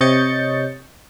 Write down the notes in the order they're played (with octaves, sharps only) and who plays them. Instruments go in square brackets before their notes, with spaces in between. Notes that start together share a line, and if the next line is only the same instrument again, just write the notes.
[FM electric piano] C3 C#5 D#5 G6 A6 C#7